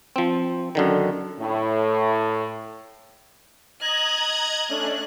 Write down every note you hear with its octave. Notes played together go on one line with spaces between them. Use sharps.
F3 C4
F#2 D3 D#3
A2
D#5 A#5 F#6 G#6
A3 C#4 D4 F#6